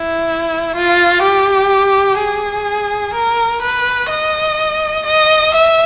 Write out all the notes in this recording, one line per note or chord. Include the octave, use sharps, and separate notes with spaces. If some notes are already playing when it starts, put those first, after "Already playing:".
Already playing: E4
F4
G4
G#4
A#4
B4
D#5
D#5
E5